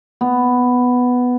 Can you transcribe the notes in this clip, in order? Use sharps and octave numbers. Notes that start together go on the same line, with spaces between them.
B3